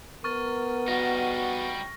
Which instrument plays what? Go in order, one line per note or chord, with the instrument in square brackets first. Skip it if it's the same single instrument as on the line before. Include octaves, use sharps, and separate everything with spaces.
[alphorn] B3 [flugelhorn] A#4 [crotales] C#6 F6 A6
[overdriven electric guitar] G3 D#4 [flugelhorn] F#4 [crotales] A#6